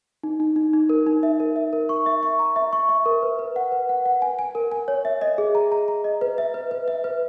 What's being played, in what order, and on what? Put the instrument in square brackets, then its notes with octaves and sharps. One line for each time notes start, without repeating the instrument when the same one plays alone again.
[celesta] D#4
D#4
D#4
D#4
A#4
D#4
E5
A#4
E5
A#4
C#6
E5
C#6
A#5
E5
C#6
E5
A#4
B4
B4
F#5
B4
F#5
F#5
G#5
G#5
A#4
G#5
C#5
E5
D#5
G#4
A#5
A#5
A#5
D#5
B4
E5
B4
B4
E5
B4